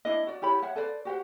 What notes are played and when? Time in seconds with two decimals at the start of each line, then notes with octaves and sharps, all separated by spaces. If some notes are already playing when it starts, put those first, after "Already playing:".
0.05 D4 E4 D#5
0.27 F#4 D5
0.42 E4 G4 C#5 B5
0.62 C#5 E5 F#5
0.76 A4 B4 C5 D5
1.05 F#4 G4 C5 F#5